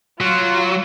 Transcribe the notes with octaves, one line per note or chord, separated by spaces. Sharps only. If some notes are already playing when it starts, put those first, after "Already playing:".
F#3 F4